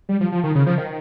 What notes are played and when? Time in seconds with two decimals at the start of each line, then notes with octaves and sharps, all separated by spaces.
0.09 G3
0.21 F3
0.32 F3
0.44 D#3
0.55 C#3
0.66 F3
0.78 D#3